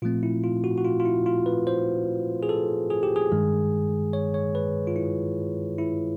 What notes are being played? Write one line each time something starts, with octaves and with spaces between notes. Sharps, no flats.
A#2 F3 A3 C4 F4
E4
F4
F#4
F#4
F4
F4
E4
F4
B4
C5
G#4
A4
G#4
G4
G#4
G2 D#3 G#3
C#5
C#5
B4
F4
E4
E4